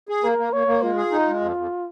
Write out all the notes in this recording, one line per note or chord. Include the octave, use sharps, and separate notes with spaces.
G#4
A#3 A#4
A#3
A#3 C#5
A#3
G#3 F4
G#4
D#4
G#3
F2
F2